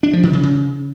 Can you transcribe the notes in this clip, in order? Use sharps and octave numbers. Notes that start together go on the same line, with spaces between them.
D4
F3
D#3
C#3
C#3